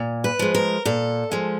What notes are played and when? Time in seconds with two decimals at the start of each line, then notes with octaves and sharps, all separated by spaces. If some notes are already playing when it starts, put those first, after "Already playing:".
Already playing: A#2
0.24 B4
0.39 F3 G#3
0.55 A#4
0.85 A#2 A4
1.32 F3 G#3